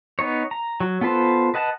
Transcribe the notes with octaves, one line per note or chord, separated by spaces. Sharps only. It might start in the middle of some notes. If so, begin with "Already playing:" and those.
B3 D#4 C#5
A#5
F#3
B3 F4 A4 B4 C5
B4 D#5 F#5 A5